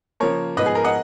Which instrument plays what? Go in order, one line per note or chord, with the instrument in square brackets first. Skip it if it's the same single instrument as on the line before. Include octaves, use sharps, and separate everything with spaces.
[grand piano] C#3 F3 A#3 A#4 C#5
G#2 F3 B3 B4 D#5
G#4
A#4
D#5 F#5